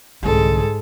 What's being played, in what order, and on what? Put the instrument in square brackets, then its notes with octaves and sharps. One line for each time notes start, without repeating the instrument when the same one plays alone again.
[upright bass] C2 D3 [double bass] G#2 G#3 [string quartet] A4